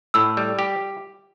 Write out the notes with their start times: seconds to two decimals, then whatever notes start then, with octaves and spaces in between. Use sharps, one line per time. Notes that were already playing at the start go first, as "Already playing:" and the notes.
0.14 A2 E6
0.37 G3
0.59 G4